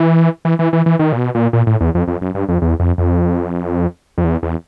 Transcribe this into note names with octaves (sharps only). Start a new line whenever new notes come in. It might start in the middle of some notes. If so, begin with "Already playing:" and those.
Already playing: E3
E3
E3
E3
E3
D#3
A#2
B2
A#2
A#2
A2
E2
F2
F2
F#2
G2
F2
E2
F2
F2
F2
E2
E2